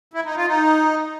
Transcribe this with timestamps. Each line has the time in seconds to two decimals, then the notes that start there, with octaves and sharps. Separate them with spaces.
0.13 E4
0.25 D#4
0.36 F4
0.47 D#4